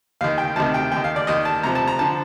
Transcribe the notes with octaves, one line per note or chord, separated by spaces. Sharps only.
D#2 D#3 F5
G5
D2 C3 D#3 A5
G5
D#2 D#3 G5
F5
D5
D#2 D#3 D#5
A5
C2 C3 F3 A#5
A5
A#5
D3 F3 A5